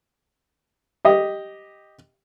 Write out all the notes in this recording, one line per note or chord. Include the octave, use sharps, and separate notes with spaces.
G4 D#5